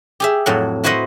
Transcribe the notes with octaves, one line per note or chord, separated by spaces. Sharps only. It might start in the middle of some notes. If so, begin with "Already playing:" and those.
G4 G#4 E5
F2 A2 F#3 F#5
E4 F#4 B4 C5 D#5 F#5